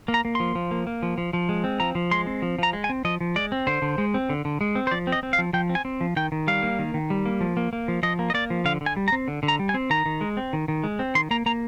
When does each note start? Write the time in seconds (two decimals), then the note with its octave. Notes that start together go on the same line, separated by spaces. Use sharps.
0.08 A#3
0.14 A#5
0.25 A#3
0.35 F3 C6
0.55 F3
0.71 A#3
0.87 A#3
1.03 F3
1.18 F3
1.33 F3
1.49 G#3
1.64 C4
1.80 F3 A#5
1.95 F3
2.11 G#3 C6
2.27 C4
2.42 F3
2.59 F3 A#5
2.73 G#3
2.84 G#5
2.89 C4
3.05 F3 D#5
3.21 F3
3.36 G#3 D5
3.52 C4
3.67 D3 C5
3.82 D3
3.98 G#3
4.14 C4
4.29 D3
4.45 D3
4.61 G#3
4.75 C4
4.87 C5
4.91 F3 D5
5.07 C4
5.12 D#5
5.23 C4
5.33 F5
5.39 F3
5.53 F3 G5
5.70 C4
5.75 G#5
5.85 C4
6.01 F3
6.16 D#3 G5
6.32 D#3
6.47 G3 F5
6.63 A#3
6.79 D#3
6.94 D#3
7.10 G3
7.25 A#3
7.41 F3
7.57 A#3
7.73 A#3
7.88 F3
8.03 F3 D#5
8.19 A#3
8.30 D#5
8.34 A#3 D5
8.50 F3
8.65 D3 F5
8.81 D3
8.86 G#5
8.97 G3
9.08 A#5
9.12 C4
9.28 D3
9.43 D3
9.48 A#5
9.59 G3
9.69 G#5
9.74 C4
9.90 D#3 A#5
10.06 D#3
10.21 G#3
10.37 C4
10.53 D#3
10.68 D#3
10.84 G#3
10.99 C4
11.15 D#3 C6
11.31 A#3 A#5
11.46 A#3 A#5